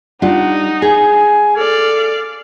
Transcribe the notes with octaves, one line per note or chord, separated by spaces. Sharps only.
G3 D4 D#4 F4 F#5
G#4 G#5
A4 D5 F5